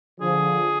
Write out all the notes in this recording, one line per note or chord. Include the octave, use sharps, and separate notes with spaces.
D3 F3 G#4